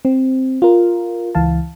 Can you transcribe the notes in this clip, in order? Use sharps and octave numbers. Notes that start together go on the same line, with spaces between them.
C4
F4 A#4
C#2 E3 F5 A5